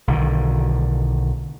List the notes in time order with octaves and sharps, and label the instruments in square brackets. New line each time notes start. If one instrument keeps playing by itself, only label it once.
[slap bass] B1 D3 D#3